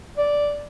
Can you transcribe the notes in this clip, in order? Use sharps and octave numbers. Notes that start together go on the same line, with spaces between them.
D5